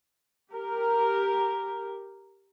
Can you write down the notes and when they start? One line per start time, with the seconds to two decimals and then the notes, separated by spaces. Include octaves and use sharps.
0.52 G4 A#4